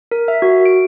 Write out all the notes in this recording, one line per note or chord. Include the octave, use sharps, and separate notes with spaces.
A#4
E5
F#4
D7